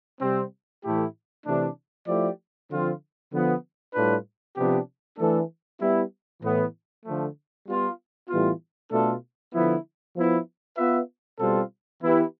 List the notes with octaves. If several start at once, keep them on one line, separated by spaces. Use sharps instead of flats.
C3 G3 C4
A2 E3 A3 E4 G4
C3 E3 A3 D4
F3 A3 E4 G4 D5
D3 F3 C4 F4
D3 F3 B3
A2 G3 D4 F4 B4
C3 F3 B3 D4 G4
E3 A3 D4 A4
G3 B3 E4
A2 E3 B3
D3 F3 A3
G3 B3 F4
A2 E3 G3 B3 F4
B2 A3 D4 F4 A4
D3 F3 B3 E4
F3 B3 E4
B3 F4 B4 E5
B2 G3 C4 F4 A4
E3 B3 E4 G4 B4